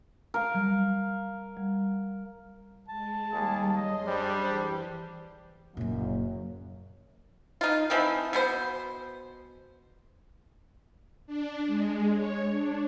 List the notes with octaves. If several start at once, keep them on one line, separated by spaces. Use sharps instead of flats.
A#4 F5
F#3 G3
G3
G#3 A5
D#2 G3 G#4
F#2 F#3 G#4 D#5 C6
G3 D4 C5
E3 G4 C5
F#1 F#2 A#2
D#4 F4
E3 F3 C4 D#4
B2 B3 C5
D4
G#3
C#5
D4